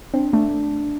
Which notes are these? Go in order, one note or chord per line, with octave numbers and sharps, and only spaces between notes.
C4 D4
A3 D4